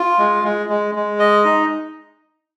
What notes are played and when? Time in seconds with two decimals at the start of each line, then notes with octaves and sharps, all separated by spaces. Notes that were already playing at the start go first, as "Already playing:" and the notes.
Already playing: F4
0.18 G#3
0.44 G#3
0.69 G#3
0.95 G#3
1.19 D#5
1.45 D#4